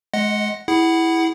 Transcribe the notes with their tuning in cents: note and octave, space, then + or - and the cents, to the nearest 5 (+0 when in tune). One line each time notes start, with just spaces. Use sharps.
G#3 +30 D#5 +0 F#5 +0
E4 -5 G#4 -10 F#5 +20